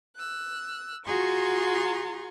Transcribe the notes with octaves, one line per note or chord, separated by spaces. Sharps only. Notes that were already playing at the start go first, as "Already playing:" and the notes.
E6 F#6
F4 F#4 G#4 A#5 C6 C#6